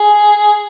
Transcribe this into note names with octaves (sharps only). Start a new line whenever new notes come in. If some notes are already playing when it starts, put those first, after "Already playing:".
Already playing: G#4